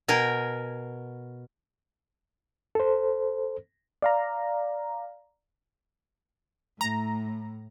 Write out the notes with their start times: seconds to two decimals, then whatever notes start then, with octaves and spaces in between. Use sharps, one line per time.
0.08 B2 A#4 G5 G#5
2.75 A4 C5
4.02 D5 F5 A#5
6.81 A2 A#5